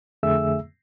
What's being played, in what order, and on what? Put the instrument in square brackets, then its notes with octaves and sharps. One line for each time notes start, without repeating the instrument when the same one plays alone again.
[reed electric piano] F2 D3 A3 G#4 E5 E6